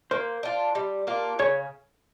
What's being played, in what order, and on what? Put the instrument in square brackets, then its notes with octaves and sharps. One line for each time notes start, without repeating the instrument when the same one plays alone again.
[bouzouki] A#3 [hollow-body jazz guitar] C5
[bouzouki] D4 F4
G3
A#3 D4 F4
[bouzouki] C#3 [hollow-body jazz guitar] C#5